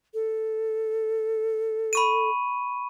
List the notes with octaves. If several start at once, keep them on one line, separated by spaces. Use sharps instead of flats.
A4
B5 C#6 D#7